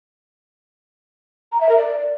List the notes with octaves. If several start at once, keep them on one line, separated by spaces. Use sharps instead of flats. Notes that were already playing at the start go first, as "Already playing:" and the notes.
A#5
E5
A#4
D5